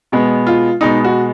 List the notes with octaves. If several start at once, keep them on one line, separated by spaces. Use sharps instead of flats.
B2 G#3 B3
F4
B2 G#3 B3 D#4
F#4